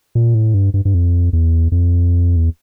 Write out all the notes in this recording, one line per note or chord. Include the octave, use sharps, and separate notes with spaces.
A#2
A2
G2
G2
G2
F2
E2
F2
E2